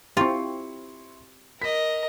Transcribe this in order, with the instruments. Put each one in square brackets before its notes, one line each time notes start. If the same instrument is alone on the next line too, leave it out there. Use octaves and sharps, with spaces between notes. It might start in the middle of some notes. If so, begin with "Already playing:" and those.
[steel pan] C4 G4 [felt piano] E4 C6 C#6 [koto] F4
[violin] A#4 D#5 [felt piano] B6